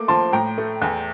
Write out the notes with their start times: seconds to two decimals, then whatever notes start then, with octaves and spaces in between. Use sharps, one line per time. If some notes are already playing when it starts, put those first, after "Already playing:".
Already playing: A3 A#3 D6
0.08 F3 A5 C6
0.33 A2 G5 A#5
0.58 A3
0.82 E2